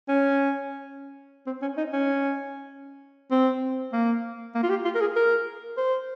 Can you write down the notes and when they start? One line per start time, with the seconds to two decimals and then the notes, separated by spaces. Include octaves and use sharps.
0.08 C#4
1.46 C4
1.62 C#4
1.77 D#4
1.93 C#4
3.31 C4
3.93 A#3
4.55 A#3
4.63 F4
4.70 G4
4.85 F4
4.95 A#4
5.00 G#4
5.16 A#4
5.77 C5